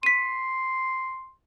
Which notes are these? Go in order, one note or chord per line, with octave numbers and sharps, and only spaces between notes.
C6 B6 D#7